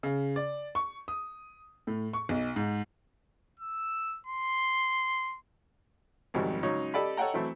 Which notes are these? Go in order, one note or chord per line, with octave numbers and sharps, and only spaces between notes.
C#3
D5
C#6
D#6
A2
C#6
B1
G#2
E6
C6
C2 F2 G#2 D#3 F#3 G3
C#3 F#3 G#3 C#4 D#4
G4 A4 D5 D#5 B5
A4 C#5 D#5 F#5 G5 A#5
E3 F#3 A3 C4 E4